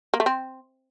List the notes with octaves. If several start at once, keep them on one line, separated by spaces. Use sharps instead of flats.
A#3
A3
C4